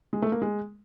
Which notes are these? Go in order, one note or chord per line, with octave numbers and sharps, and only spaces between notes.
G#3
A3
A#3
G#3